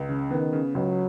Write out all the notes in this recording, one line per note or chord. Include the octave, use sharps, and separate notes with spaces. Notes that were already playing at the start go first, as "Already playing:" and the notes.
Already playing: C#2
C#3
D#3 B3
C#3
C#2 F#3